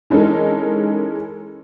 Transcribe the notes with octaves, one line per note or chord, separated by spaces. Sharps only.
E3 G#3 C#4 D#4 A4 A#4